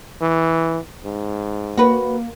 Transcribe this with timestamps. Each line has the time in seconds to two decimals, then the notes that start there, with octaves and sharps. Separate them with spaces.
0.22 E3
1.05 G#2
1.78 A#3 F#4 B4